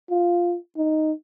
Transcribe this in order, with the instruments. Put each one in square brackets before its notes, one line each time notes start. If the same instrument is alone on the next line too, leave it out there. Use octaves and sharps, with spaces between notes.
[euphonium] F4
D#4